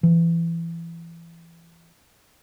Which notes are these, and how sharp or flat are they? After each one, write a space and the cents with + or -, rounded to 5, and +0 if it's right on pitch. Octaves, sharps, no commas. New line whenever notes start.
E3 +25